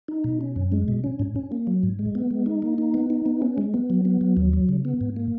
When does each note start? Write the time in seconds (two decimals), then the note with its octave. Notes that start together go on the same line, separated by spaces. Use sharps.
0.08 D#4
0.24 B2
0.41 C#4
0.56 F#2
0.72 G#3
0.88 B2
1.04 C#4
1.19 G#2
1.36 C#4
1.52 A#3
1.67 F#3
1.83 G#2
1.99 G#3
2.15 B3
2.31 G#3
2.46 D#4
2.62 A#3
2.78 D#4
2.94 B3
3.10 D#4
3.26 B3
3.42 C#4
3.58 G#3
3.74 B3
3.90 F#3
4.05 B3
4.21 F#3
4.37 D#2
4.53 F#3
4.69 C#3
4.85 B3
5.01 G#2
5.16 A#3